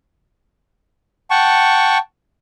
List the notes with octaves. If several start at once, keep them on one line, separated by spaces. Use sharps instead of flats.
F#5 G5 A5 C#6